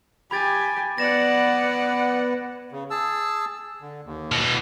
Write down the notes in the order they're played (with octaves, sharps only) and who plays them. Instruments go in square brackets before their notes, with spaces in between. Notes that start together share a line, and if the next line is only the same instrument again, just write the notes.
[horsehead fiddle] G4 G#5 [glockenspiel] B5 G#6 A6
[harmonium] B3 B4 [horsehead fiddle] D5 F#5 [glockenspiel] A#6 E7
[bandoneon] C#3
G#4 A5 E6
D3
D#2
[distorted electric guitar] B2 E3